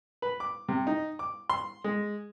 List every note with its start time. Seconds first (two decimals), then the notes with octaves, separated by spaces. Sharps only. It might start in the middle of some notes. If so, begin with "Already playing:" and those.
0.22 B4
0.40 D6
0.69 C3
0.87 D#4
1.19 D6
1.50 C6
1.84 G#3